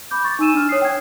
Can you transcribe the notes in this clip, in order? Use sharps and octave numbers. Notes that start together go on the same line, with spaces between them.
B5 D6 G6
C#6 A6
D#4 G#5 E6 D#7 E7
D4 F6
C#5 D#6 C7
G5 G#6